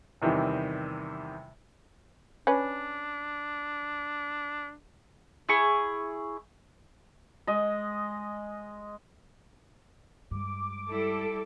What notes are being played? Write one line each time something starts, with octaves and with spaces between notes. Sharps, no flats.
E2 C3 D#3 E3 G3
C#4 D4 B4
E4 G#4 C#6
G#3 D#5
G2 G#3 D6
G3 E4 A4